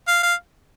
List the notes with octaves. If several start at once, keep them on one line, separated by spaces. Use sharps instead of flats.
F5
F5